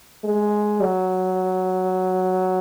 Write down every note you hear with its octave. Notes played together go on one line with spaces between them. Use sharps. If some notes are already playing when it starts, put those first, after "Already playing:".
G#3
F#3